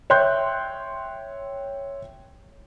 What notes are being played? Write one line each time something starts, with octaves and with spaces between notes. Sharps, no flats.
C#5 E5 G5 C6 F#6 G6